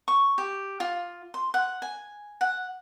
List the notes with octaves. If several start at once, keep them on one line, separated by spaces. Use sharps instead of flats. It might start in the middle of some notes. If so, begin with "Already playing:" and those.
C#6
G4
F4
C6
F#5
G#5
F#5